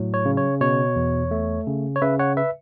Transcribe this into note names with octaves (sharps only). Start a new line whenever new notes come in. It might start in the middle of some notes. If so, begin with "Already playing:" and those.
Already playing: A2 F#3
C#5
C#3
C#5
B2 C#5
E2
A3
C#3
C#5
C#3 B4 E5
C#5 F#5
B4 E5